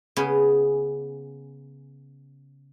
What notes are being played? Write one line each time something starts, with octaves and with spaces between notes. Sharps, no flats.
C#3 B3 C#4